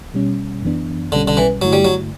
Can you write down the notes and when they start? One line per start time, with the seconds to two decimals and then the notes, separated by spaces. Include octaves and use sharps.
0.14 B2 G3 C#4
0.62 F#2 E3 B3 D4
1.12 B1 B2 D3 G3 C#4
1.28 D3
1.37 E3
1.61 G2 D3 F#3 A3 E4
1.73 G3
1.85 F#3